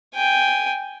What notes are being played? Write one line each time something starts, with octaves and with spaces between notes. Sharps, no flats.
G5 G#5